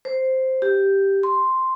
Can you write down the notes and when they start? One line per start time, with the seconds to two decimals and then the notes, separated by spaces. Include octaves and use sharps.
0.05 C5
0.62 G4
1.23 C6